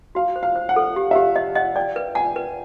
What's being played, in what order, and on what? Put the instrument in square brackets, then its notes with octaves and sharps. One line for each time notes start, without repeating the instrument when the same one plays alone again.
[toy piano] F#4 [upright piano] F5
[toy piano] C5
[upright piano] F5
[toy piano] C5
[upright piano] F#5
[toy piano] A4
G4
[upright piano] E5
[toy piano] G4 [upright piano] F5
[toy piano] D#5 [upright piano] E5
[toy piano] D#5 [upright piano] F#5
[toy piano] D5 [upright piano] G5
[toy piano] B4
[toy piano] F#5 [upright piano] G#5
[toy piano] B4